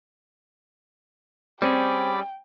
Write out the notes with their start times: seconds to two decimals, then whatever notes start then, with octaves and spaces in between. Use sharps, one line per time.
1.62 G3 C4 C#4 G#4 D5 G5 B5